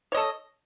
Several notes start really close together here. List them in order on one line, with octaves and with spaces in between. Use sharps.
C#5 D#5 A4